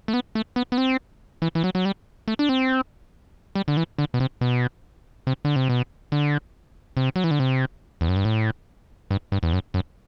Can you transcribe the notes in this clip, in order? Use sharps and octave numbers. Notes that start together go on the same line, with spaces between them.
A3
B3
A3
B3
B3
C4
E3
E3
F#3
F#3
G3
A3
D4
C4
G3
D3
E3
D3
B2
C3
B2
C3
D3
C3
B2
D3
C3
F#3
E3
D3
C3
E2
F#2
G2
A2
G2
G2
E2
F#2
F#2